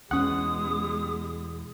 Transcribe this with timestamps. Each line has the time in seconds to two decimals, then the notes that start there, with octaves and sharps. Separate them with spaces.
0.11 E2 B2 G#3 C#4 F#5 D#6